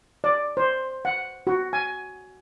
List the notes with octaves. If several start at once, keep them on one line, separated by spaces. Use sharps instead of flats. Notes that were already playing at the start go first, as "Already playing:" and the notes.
D5
C5
F#5
F#4
G#5